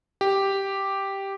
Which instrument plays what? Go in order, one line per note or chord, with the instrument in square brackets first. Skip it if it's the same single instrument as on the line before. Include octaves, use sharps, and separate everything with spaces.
[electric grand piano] G4